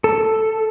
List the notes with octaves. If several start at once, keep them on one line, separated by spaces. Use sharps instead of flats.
A4